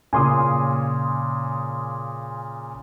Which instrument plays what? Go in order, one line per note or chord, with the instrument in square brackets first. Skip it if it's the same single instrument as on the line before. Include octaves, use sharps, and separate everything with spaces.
[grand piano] A#2 C#3 [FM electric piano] G#5 C6 D#6